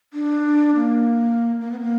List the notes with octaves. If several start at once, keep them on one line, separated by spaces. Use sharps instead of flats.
D4
A#3
A#3
B3
A#3